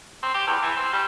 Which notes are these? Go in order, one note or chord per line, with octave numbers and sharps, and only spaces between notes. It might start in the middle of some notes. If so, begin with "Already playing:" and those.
C4
G4
E2
E3
C4
G3